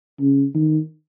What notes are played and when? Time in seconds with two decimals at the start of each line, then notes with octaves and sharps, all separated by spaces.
0.20 C#3
0.55 D#3